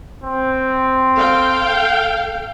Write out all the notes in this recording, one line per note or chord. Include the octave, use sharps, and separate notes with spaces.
C4
A4 F5 G5